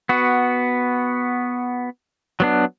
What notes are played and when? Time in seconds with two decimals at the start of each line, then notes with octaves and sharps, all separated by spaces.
0.09 B3 F#4
2.40 F#3 B3 D4